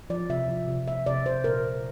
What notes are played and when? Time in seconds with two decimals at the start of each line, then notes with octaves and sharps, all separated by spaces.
0.10 F3 D5
0.29 C3 E5
0.49 F3
0.68 C3
0.88 A#3 E5
1.06 C3 D5
1.26 C3 C5
1.44 A#2 A#4
1.63 A#2